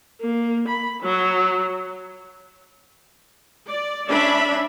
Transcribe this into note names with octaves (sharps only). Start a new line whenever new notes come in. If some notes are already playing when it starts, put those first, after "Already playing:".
A#3
B5
F#3
D5
C#4 D4 E5 B5